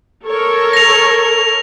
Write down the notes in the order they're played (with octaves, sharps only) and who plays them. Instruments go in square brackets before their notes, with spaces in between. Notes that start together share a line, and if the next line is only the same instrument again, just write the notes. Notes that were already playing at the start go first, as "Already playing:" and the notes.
[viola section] A4 A#4 C#5
[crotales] A#6 F7